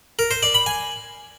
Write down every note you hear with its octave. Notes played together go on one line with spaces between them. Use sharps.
A#4
C5
D5
B5
G#5